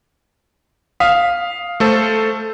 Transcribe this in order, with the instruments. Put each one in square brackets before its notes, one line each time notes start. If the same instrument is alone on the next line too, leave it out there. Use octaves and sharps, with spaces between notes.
[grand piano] F5 D#6 B6
[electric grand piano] A3 A4 C5